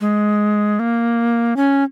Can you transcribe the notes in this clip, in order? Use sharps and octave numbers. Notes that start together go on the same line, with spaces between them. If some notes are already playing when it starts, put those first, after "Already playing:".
G#3
A#3
C#4